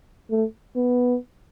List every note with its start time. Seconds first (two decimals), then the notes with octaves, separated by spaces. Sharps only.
0.30 A3
0.76 B3